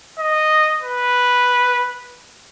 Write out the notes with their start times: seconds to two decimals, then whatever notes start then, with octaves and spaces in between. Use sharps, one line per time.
0.19 D#5
0.82 B4